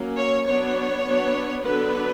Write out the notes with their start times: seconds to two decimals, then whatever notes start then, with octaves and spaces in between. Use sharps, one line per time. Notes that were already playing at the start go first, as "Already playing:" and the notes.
Already playing: F#3 A#3 C#4
0.17 C#5
0.46 F#3 B3 D4 C#5
1.06 F#3 B3 D4
1.64 D3 F#3 B3 D4 B4